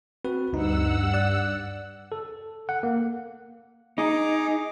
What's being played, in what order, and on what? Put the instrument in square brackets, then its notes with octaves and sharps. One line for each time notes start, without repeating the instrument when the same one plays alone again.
[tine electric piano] C4 F#4 B4
[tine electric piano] D2 D#4 [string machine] G2 F#5 E6
[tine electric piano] D5 F#6
A4
F#5
A#3
[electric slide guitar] D#4 [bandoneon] G#4 D6